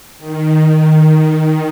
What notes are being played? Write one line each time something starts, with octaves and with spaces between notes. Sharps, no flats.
D#3